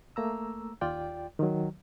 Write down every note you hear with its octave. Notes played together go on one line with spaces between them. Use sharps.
A3 A#3 A#5 E6
D#2 F4 D5 G5
D#3 F#3